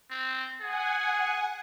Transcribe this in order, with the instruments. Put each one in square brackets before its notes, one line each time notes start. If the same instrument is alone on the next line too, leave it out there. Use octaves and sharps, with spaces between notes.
[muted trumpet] C4
[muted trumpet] G#4 [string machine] F#5 G#5